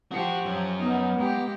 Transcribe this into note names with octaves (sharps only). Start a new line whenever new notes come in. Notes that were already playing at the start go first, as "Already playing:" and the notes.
F3 F#4 G4
F#2
B3 D#4
G#3 A#3 G4